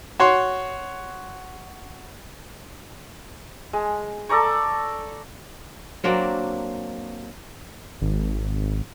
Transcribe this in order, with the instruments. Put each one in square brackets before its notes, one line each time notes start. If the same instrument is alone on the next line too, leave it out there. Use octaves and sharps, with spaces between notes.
[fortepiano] F#4 C#5 C6
[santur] G#3
A4 D5 A#5 C#6
[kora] F#3 A#3 C4 D4
[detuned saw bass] G#1